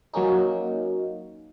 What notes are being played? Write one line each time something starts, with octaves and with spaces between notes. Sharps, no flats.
F#3 A#3 C#4 D#4